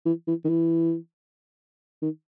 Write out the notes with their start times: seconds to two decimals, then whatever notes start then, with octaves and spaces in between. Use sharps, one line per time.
0.06 E3
0.28 E3
0.45 D#3
0.49 E3
2.02 D#3